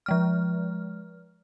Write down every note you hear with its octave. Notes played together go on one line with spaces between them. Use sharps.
F3 G#3 F6